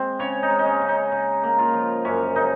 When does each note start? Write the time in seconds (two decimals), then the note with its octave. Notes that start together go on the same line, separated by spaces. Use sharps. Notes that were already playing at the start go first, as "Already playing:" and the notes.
Already playing: G#3 C4
0.19 C#3 C#5
0.43 D#4
0.50 G#3
0.59 D#4
0.66 C#4
0.81 C#3
0.89 D#4
1.12 C#3
1.43 A#3
1.58 F4
1.74 F3
2.05 F#2 C#4
2.36 C#3 D#4